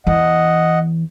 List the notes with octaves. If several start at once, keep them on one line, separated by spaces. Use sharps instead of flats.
E2 E3 D#5 F#5